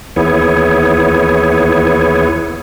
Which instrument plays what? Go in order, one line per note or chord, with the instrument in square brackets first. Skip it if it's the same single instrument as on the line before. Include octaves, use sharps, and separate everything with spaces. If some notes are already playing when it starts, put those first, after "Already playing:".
[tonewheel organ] D#2 E3 B3 E4 G#4 C#5